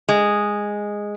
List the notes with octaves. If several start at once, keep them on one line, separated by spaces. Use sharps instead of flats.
G#3